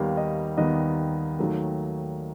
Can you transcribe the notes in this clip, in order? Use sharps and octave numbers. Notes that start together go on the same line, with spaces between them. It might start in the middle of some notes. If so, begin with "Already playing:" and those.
Already playing: D#2 D#3 G3 B3 F5
D#5
D#2 D#3 G3 B3 D#5
D#2 D#3 F#3 A3